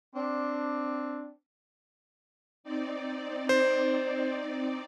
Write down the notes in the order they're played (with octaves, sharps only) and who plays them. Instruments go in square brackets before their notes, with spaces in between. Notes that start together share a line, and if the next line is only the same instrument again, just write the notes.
[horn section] C4 D4
[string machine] C4 D#4 D5
[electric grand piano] C5